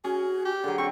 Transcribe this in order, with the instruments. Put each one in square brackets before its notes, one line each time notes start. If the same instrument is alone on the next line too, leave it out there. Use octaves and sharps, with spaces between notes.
[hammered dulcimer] C#4 [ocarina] F#4 [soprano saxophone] G#4
[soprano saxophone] G4
[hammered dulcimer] D3 F#3 [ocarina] G#4
[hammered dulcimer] C4 [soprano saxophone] C#6